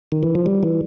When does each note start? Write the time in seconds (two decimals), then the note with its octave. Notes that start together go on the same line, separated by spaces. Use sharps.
0.12 D#3
0.23 E3
0.35 F3
0.46 G3
0.63 E3